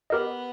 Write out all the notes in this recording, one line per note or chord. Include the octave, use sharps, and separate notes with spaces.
B3 G4 A#4 D#5